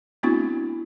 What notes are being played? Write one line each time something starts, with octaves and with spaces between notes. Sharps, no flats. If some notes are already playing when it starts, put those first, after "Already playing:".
A3 B3 C4 D4 E4 F#4